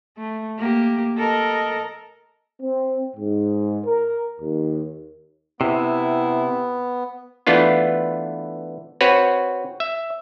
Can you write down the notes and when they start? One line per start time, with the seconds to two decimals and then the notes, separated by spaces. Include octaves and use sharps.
0.18 A3
0.58 A#3 G4
1.17 A4 A#4 D#5
2.62 C4
3.16 G#2
3.84 A#4
4.40 D#2
5.61 C3 B3 E4
7.47 E3 A3 B3 D4 F4
9.01 C4 F#4 B4 C#5
9.80 E5